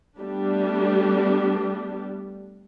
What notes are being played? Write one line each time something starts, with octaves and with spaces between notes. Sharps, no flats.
G3 A3 B3 D4 G4